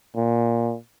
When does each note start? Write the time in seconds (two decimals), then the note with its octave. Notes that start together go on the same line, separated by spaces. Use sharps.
0.16 A#2